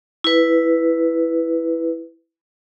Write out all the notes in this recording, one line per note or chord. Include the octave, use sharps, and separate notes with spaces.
E4 B4